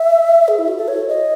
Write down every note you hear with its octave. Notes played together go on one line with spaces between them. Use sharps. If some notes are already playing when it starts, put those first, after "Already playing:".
Already playing: E5
G#4
E4
F#4
A4
C#5
D#5